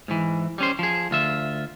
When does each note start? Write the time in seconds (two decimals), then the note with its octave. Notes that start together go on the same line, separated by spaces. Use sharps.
0.08 G#2 E3
0.58 G3 C#4 C5
0.79 F3 G#4
1.11 D2 F4 E5